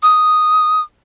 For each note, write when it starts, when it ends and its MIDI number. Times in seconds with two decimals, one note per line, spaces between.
0.03 0.81 87